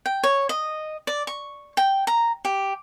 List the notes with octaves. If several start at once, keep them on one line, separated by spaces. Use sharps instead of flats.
G5
C#5
D#5
D5
C#6
G5
A#5
G4